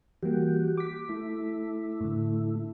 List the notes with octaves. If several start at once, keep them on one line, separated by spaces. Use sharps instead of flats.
E3 G3 A#3 F#4 G4
D6 B6
A3 E4
A2 D3